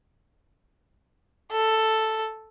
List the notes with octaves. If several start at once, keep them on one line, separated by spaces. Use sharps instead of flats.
A4